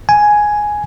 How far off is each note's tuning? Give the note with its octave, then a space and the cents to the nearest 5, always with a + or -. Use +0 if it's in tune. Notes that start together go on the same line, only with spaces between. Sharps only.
G#5 +5